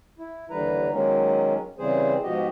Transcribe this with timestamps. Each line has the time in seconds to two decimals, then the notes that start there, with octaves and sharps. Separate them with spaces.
0.18 E4
0.50 D#2 D3 E3 G3 B4 A#5
0.92 D#3 F#3 G#3 A#3 C#4
1.78 C#3 E3 G3 C4 G#4 C5
2.23 G#2 B2 F3 F#4 G4 D#5